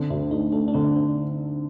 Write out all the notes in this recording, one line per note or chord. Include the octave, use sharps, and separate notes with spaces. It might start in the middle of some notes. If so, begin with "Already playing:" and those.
Already playing: D3 C4
D2 D4
A3 D#4
A3 D4
D4
D3 C4
C4